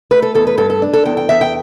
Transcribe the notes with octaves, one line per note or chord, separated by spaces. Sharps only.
A3 B4
A4
E2 A4
B4
G2 A4
A4
D4
A4
E2 G5
G5
E2 E5
G5